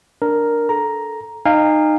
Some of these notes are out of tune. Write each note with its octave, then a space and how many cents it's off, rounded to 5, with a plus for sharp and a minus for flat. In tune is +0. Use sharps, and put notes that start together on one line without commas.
D4 +0 A#4 +0
A4 -15 A#5 +5
D#4 -20 F5 +0 G#5 -45